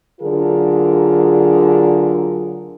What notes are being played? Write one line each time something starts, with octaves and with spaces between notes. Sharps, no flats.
D3 F#3 F4 G#4 A#4